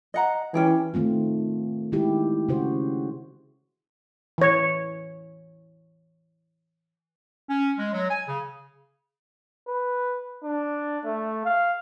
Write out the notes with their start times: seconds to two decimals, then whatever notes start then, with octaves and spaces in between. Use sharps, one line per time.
0.14 D#5 F#5 A#5
0.54 E3 C#4 G4 G#4
0.94 D#3 A3 C4 F4
1.92 D#3 G#3 E4 G4
2.49 C#3 F#4 C5
4.38 E3 C#5
7.49 C#4
7.78 G#3
7.93 F#3
8.10 G#5
8.28 C#3
9.68 B4
10.44 D4
11.05 A3
11.45 F5